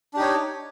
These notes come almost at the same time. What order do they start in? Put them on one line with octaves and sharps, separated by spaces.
D4 G4 D#4 C#5